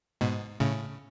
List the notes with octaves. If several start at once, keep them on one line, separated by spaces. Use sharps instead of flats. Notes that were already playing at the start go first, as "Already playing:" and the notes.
G#2 B2
A2 C#3